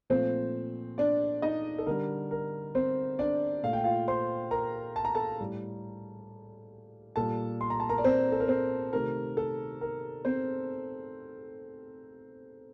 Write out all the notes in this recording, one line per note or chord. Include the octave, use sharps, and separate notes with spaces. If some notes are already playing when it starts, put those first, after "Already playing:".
A#2 F3 A3 C4 C5
D4 D5
D#4 D#5
A4
D3 G3 A#4
A#4
C4 C5
D4 D5
A#2 A3 F5
G5
F4 F5
C5 C6
A#4 A#5
A5
A#5
A4 A5
A2 G3
A#2 G3 A4 A5
C6
A#5
A5
A#4 A#5
D5
C4 C5
A4
A#4
C4 C5
C3 D#3 A3 A#4
A4
A#4
C4 C5